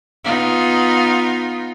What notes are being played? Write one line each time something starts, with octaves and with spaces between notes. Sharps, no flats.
B3 D#4 F4